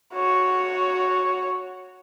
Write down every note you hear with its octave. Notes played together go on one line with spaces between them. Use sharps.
F#4 C#5